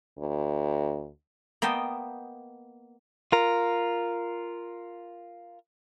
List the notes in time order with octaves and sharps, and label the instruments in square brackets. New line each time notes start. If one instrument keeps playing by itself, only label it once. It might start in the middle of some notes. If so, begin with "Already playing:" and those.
[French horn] D2
[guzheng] A#3 B3 D#5 G5 A5
[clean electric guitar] F4 A#4